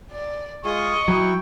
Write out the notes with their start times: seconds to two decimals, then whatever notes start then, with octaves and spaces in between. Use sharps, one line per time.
0.12 D5
0.65 G#3 F4 G#4 D#5 C#6
1.08 F#3 E4 G5